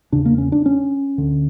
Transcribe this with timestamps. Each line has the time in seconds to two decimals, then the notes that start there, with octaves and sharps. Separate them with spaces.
0.12 E2 C#3 D4
0.25 A#3
0.38 C#4
0.52 D4
0.66 C#4
1.18 D2 D3